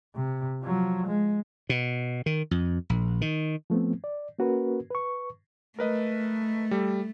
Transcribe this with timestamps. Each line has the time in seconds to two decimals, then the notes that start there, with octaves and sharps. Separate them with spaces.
0.15 C3
0.63 F3 F#3
1.07 G#3
1.69 B2
2.26 D#3
2.51 F2
2.90 A#1
3.21 D#3
3.70 F3 A3 B3 C4
4.04 D5
4.39 A#3 C#4 F#4 A#4 B4
4.91 B4 C#6
5.79 A3 A#4 B4 D#5
6.71 G3 A4